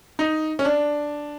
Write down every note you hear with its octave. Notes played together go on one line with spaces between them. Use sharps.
D#4
C#4
D4